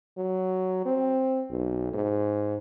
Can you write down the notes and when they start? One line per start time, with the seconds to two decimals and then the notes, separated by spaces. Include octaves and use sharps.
0.18 F#3
0.85 C4
1.50 B1
1.93 G#2